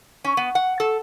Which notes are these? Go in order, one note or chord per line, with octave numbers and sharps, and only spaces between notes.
C#4
B3
F#5
A4